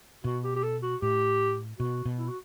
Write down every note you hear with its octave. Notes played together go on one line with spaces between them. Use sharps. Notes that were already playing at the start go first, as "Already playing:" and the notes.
B2 F#4
G4
G4
A4
F#4
A2 G4
B2 F#4
B2
E4
F#4